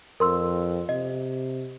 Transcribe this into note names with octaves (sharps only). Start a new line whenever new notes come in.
F2 A#4 C6 E6
C3 D#5